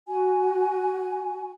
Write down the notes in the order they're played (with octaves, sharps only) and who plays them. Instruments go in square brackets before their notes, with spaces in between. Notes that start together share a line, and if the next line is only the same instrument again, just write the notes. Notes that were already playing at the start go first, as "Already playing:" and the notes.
[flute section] F#4 G#5